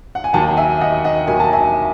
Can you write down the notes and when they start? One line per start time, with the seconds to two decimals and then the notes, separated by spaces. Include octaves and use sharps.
0.15 F#5
0.24 G#5
0.33 D#2 D#3 F#3 F#5 A5
0.57 E5 G#5
0.81 D#5 F#5
1.04 D#5 F#5
1.28 D#2 D#3 F#3 G#5
1.40 A5
1.52 E5 G#5